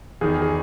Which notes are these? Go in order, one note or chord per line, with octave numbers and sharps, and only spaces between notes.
E2 D#3 G#4
G#4